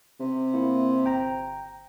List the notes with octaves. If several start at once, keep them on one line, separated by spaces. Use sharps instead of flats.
C3
A#3 E4
G1 G5 A#5